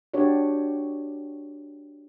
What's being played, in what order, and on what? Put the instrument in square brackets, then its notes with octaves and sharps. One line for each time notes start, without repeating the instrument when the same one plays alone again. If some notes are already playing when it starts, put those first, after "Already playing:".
[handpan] D4 F#4 G4 C#5 D5